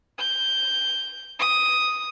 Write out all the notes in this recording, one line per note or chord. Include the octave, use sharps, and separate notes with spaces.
G6
D#6